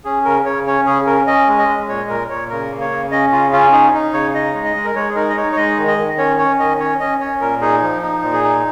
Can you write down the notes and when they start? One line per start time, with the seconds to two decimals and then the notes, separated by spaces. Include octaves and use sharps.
0.05 C#4 G#4
0.25 C#3 A#4
0.45 C#3 C#5
0.67 C#4 C#5
0.86 C#3 G#4
1.07 C#4 A#4
1.27 C#4 D#5
1.48 G#3
1.58 D#5
1.68 G#3
1.89 A#2 C#5
2.09 A#2 A#4
2.30 A#2 C#5
2.50 C#3 A#4
2.71 A#3
2.81 C#5
2.91 C#3
3.11 C#4 D#5
3.32 C#3 F4
3.52 C#4 F4
3.73 D#4 G#4
3.94 D#4
4.13 C#3 C#5
4.34 D#4 D#5
4.54 G#3
4.65 D#5
4.76 G#3
4.85 A#4
4.95 G#3 C#5
5.09 G#4
5.15 D#4 A#4
5.29 D#5
5.37 D#4 C#5
5.52 C#5
5.56 G#3 D#5
5.78 D#3
5.87 D#5
5.98 D#3
6.18 C#4 C#5
6.38 C#4 C#5
6.59 D#3 D#5
6.79 C#4 C#5
7.00 C#4 D#5
7.20 C#4 C#5
7.41 A#2 A#4
7.61 D#4 G#4
7.82 F3
8.02 D#4
8.22 A#2
8.33 G#4
8.44 D#4